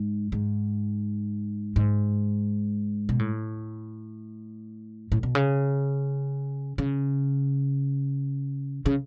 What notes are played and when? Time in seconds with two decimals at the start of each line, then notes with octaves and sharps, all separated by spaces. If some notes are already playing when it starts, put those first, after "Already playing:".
Already playing: G#2
0.32 G#2
1.76 G#2
3.09 B2
3.19 A2
5.12 A2
5.23 B2
5.35 C#3
6.78 C#3
8.86 C#3